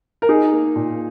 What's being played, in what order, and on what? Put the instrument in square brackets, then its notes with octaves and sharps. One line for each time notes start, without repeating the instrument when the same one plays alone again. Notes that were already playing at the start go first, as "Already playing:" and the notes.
[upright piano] A#4
D#4 G#4
A#3
A#2